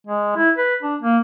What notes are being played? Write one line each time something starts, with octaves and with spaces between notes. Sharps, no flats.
G#3
E4
B4
D4
A#3